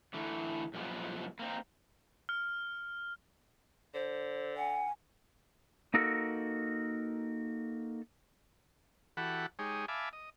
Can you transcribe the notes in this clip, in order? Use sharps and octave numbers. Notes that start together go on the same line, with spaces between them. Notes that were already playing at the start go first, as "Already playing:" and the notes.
D3 E3 A3
F#2 A#2 F3 G3 G#3 B3
A#3 C4 D#4
F6
D3 C5
F#5 G#5
A#3 D#4 F#4 A4 A#4
E3 F#4 G4 A4 F#5 B5
G#3 D#4 G4 G#4 C#5
E5 F5 G#5 A5 B5 D6
D#5